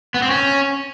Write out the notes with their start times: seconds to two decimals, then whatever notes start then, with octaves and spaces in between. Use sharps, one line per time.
0.14 B3
0.22 C4
0.30 C#4